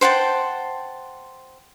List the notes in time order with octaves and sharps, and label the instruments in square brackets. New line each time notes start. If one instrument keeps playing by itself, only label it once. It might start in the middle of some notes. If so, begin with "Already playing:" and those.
[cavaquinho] C5 F#5 G5 A5